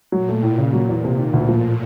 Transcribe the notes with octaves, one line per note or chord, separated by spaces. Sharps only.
A#2 F#3
A3
A2
A#2 C#3
F#3
E2
C3
D#3
D2
A2 F3